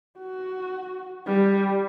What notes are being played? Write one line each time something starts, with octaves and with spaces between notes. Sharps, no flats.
F#4
G3